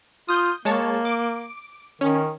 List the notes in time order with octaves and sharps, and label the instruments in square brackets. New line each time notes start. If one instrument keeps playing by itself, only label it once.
[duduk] F4 [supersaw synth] D#6 G6
[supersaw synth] G#3 C#5 A5 [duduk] A#3
[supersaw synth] D6 D7
[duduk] D#3 [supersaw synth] C#4